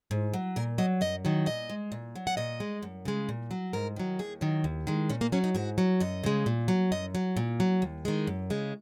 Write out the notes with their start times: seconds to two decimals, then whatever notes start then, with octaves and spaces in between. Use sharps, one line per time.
0.11 G#2
0.34 F#3
0.56 A#2 A#4
0.78 F#3 D#5
1.01 F#2 D#5
1.25 D#3 F#3
1.46 A#2 D#5
1.70 G#3
1.92 A#2
2.16 F#3
2.27 F#5
2.37 A#2 D#5
2.60 G#3
2.83 F#2
3.05 C#3 G#3
3.29 A#2
3.51 F#3
3.73 G#2 A#4
3.96 D#3 F#3
4.19 D#2 G#4
4.41 D#3 F#3
4.64 D#2
4.87 D#3 G#3
5.10 A#2 C#4
5.21 A#3
5.32 F#3 C#4
5.44 D#4
5.55 G#2 F#4
5.78 F#3
6.00 F#2 D#5
6.24 C#3 G#3
6.46 A#2
6.68 F#3
6.92 F#2 D#5
7.15 F#3
7.37 A#2
7.60 F#3
7.82 D#2
8.05 D#3 G#3
8.27 F#2
8.50 C#3 G#3